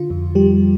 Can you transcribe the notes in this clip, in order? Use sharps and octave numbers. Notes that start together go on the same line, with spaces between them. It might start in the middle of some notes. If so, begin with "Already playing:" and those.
Already playing: D3 F4
F2
F3 G3 G4